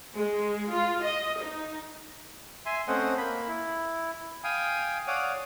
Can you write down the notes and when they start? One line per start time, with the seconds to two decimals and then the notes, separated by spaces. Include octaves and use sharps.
0.16 G#3
0.73 F4
1.04 D#5
1.43 D#4
2.66 E5 G#5 C6
2.88 A3 C4 C#4 C5 D#5 F#5
3.18 A#3 B5
3.48 E4
4.44 F5 G5 G#5 D#6
5.07 C#5 D5 F5 F#5 D6 D#6